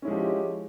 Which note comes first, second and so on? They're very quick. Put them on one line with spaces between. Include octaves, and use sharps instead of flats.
C#4 E4 G#3 F3 G4